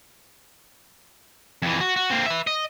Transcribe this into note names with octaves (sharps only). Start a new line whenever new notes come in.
F2 E3
F#4
F#4
A#3 C4
B4 E5
D#5